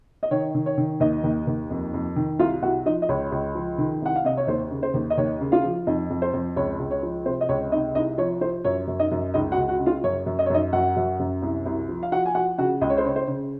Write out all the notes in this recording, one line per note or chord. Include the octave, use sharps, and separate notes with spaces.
D#5
D#3 C#5
D#3
C#5
D#3
D#2 D#4 D#5
D#2
D#2
F2
F2
D#3
C2 F4 F5
C2 F#4 F#5
F3 D#4 D#5
D#5
C#2 C#5
C#2
F3
D#3
C2 F#5
F5
C3 D#5
C#5
D#2 C5
C#3
C5
D#2
D#5
D#2 C#5
C#3
F4 F5
F3
F2 D#4 D#5
F2
C5
F2
C#2 C#5
C#2
C#5
F3
C3 C5
D#5
C#2 C#5
C3 D#4 D#5
C2 D#4 D#5
F3 C#5
F3 C5
F#2 C#5
F#2
D#4 D#5
F#2
C#2 D#4 D#5
F#4 F#5
C#2
F#4 F#5
C#3
F4 F5
F#2 C#5
F#2
D#5
C#5
F#2 D#4 D#5
F#2 F#4 F#5
F#2
F#2
C2
C2
F3
F5
F3 F#4 F#5
G#5
F3 F#4 F#5
C#3 F#4 F#5
C#2 D#5
C#5
C5
C#3 C#5
C5
C#3